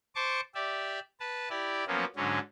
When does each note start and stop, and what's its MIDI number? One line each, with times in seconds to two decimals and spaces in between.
0.15 0.41 72
0.15 0.41 81
0.15 0.41 85
0.15 0.41 86
0.55 0.99 67
0.55 0.99 74
0.55 0.99 76
1.20 1.49 71
1.20 1.49 81
1.50 1.85 64
1.50 1.85 67
1.50 1.85 74
1.87 2.05 53
1.87 2.05 54
1.87 2.05 58
1.87 2.05 59
1.87 2.05 61
2.16 2.39 44
2.16 2.39 50
2.16 2.39 54
2.16 2.39 61